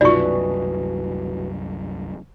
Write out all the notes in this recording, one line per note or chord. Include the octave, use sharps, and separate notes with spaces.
C2 F#2 B2 E3 D#4 F4 D5 C#6